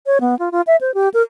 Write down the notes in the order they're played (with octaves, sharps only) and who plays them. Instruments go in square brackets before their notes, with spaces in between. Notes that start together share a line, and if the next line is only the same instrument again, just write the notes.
[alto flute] C#5
B3
F4
F4
E5
C5
G4
A#4